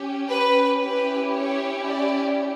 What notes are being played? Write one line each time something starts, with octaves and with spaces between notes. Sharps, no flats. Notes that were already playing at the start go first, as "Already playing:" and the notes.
Already playing: C#4 G4
B4
C#4 E4 G4 B4
C#5
D5